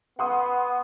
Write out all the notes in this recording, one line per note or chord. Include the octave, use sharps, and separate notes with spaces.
B3 F#5 C6 D#6